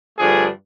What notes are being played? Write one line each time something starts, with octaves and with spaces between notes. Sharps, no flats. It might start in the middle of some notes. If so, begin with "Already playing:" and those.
G2 D3 F3 A3 D4 G#4